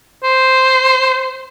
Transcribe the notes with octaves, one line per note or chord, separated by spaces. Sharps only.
C5